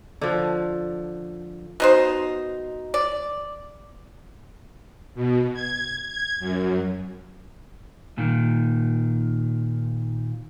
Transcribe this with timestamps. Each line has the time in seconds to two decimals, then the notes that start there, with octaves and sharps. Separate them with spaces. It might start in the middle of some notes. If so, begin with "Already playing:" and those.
0.21 D3 F3
1.80 B2 D#4 C5
2.94 D5
5.15 B2
5.54 G#6
6.08 G#6
6.40 F#2
8.18 A#2 D#3